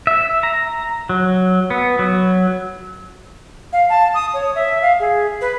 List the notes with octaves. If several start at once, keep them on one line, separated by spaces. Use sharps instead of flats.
E5
A#5
F#3
B3
F#3
F5
A5
D#6
C#5
E5
F5
G#4
B4